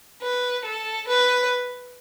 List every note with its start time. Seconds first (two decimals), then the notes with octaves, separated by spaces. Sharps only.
0.22 B4
0.65 A4
1.08 B4